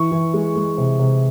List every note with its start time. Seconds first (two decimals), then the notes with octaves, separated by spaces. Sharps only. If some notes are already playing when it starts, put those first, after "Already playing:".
Already playing: E3 C#6
0.12 E3
0.34 G#3
0.56 G#3
0.78 C3
0.99 C3